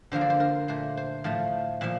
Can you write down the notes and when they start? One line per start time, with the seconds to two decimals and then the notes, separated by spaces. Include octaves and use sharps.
0.12 D3 F3 A#3 C5
0.21 D5
0.30 C5
0.40 A#4
0.68 A#2 A3 C5
0.97 C5
1.24 A2 F3 A3
1.81 A#2 F3 E5